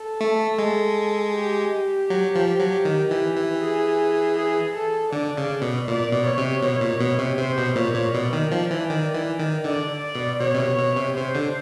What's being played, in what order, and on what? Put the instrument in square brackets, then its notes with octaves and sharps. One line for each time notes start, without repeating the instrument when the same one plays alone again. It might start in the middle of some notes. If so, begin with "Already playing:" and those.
Already playing: [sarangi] A4
[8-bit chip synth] A3
G#3
[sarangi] G4
[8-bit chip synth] F#3
F3
F#3
D#3
E3
E3
[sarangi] G#4
G#4
A4
[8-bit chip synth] D3 [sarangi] D5
[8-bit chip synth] C#3
B2
[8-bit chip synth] A#2 [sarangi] D5
[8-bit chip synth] B2
[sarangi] C#5
[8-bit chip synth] C3
[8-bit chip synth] B2 [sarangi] C#5
[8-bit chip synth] A#2
B2
C3
[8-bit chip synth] C3 [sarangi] C5
[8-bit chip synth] B2
[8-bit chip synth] A#2 [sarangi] C#5
[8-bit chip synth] A#2
[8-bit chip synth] B2 [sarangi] D5
[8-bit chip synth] D#3
F3
E3
D#3
E3
D#3
[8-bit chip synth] D3 [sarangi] D5
[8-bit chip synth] B2
[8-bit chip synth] B2 [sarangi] C#5
[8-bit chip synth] C3
B2
B2
C3
[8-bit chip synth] C3 [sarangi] C5
[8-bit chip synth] D3